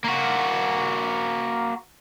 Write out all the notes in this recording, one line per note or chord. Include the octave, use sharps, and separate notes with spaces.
A#3 F#4